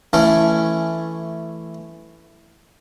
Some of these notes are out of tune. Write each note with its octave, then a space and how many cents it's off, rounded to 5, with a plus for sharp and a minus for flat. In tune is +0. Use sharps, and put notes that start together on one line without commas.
E3 +5 A3 +0 C#4 +0